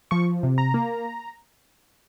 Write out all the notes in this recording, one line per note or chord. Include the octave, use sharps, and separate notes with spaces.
F3 C#6
C3
A#5
A#3